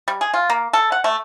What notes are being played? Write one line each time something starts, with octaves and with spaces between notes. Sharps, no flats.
G3
G#4
F4
A#3
A4
F#5
A3